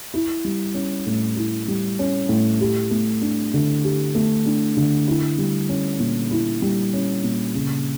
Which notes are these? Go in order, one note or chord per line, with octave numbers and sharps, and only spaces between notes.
E4
G3
C#4
A2
E4
G3
C#4
A2
G4
A3
D4
D3
G4
A3
D4
D3
E4
G3
C#4
A#2
E4
G3
C#4
A#2
C#3